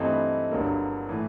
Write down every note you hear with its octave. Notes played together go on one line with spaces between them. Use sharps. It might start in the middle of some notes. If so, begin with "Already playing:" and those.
Already playing: G2 E3 A3 C4 D#4
G1 G2 D3 F#3 A#3
A2 E3 A3